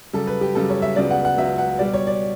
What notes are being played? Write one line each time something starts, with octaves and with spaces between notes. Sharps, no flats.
F#2 C#3 G3 A4
B4
G4
F#2 C#3 G3 A4
C#5
E5
C#2 C#3 F#3 B3 D5
F#5
F#5
C#2 C#3 F#3 B3 E5
F#5
B2 G3 B3 D5
C#5
D5